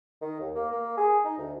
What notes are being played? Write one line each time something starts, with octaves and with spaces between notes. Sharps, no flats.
D#3
D#2
A#3
A#3
G#4
D#4
D2